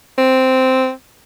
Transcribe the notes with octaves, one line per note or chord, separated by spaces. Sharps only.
C4